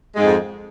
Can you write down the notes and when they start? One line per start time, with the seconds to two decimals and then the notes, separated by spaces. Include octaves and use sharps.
0.15 G#3
0.18 G#2
0.22 F2